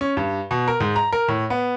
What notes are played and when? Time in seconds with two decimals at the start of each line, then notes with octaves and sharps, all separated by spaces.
0.01 C#4
0.17 G2
0.51 B2
0.68 A#4
0.80 G#2
0.96 A#5
1.13 A#4
1.28 A2
1.50 B3